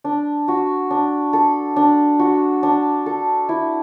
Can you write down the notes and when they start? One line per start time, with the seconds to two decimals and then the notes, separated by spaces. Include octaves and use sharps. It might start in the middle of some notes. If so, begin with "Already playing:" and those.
0.04 D4
0.48 F#4
0.90 D4
1.33 A4
1.76 D4
2.19 F#4
2.63 D4
3.06 A4
3.49 E4